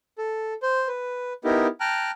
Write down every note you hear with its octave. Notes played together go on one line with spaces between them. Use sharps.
A4
C5
B4
B3 D#4 E4 G4 A#4
G5 A5 A#5 F6 F#6